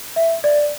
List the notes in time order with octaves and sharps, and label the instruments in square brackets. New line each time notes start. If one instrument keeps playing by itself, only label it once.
[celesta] E5
D5